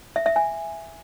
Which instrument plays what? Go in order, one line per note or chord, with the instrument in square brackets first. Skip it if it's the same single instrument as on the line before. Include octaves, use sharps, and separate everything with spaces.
[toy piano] E5
E5
G#5